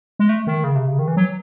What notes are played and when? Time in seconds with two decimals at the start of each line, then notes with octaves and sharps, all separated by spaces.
0.19 G#3
0.29 A3
0.47 D#3
0.64 C#3
0.75 C3
0.87 C#3
0.99 D#3
1.08 E3
1.17 F#3